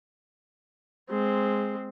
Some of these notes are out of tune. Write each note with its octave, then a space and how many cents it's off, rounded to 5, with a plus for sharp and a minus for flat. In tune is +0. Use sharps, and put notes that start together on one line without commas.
G#3 +0 C4 -5